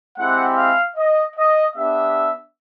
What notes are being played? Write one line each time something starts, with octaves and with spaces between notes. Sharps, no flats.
G#3 C4 E4 G4 F#5
F5
D#5
D#5
B3 D4 G4 E5